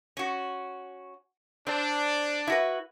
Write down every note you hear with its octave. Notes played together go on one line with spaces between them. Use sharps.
C#4 F#4
C4 D4
E4 F#4 B4